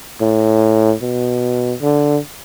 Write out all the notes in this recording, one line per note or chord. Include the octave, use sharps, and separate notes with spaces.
A2
B2
D3